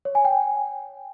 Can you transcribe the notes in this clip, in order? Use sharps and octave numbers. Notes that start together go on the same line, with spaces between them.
C#5
G#5
G5